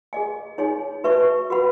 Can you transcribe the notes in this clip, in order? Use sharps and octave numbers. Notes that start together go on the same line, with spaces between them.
G#4 D#5 G#5
D#4 G#4 C#5 G#5
F#4 B4 E5 A5 C#6
F#4 B4 F#5 B5